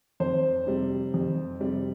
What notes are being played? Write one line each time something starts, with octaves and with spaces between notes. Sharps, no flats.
F2 C5
C3 G3
F2
C3 G3